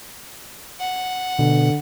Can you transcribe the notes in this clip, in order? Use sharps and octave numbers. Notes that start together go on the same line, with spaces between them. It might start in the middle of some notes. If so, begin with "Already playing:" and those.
F#5
B2 D3